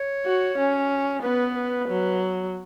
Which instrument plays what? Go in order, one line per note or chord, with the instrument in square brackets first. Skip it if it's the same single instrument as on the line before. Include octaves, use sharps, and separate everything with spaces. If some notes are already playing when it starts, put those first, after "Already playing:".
Already playing: [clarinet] C#5
[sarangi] F#4
C#4
[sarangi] B3 [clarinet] B4
[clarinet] B4
[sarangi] F#3